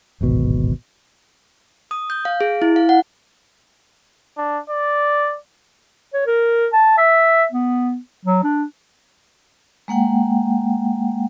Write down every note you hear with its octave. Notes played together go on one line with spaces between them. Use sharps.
D1 G#1 B2
D#6
G6
F5
G#4
E4
F5
F#5
D4
D5
C#5
A#4
A5
E5
B3
F#3
D4
G#3 A#3 F#5 G5